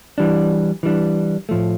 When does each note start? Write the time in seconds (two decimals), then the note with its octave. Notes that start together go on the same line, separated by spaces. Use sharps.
0.18 E3 G3 D4
0.83 E3 G3 D4
1.49 A2 F3 A3